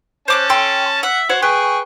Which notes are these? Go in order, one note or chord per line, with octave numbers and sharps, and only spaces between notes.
C#4 C5 A5 D6 F#6
A4 G5 C6
E5 F#5
F#4 C5 C#5 F#5
G#4 B4 G5 C#6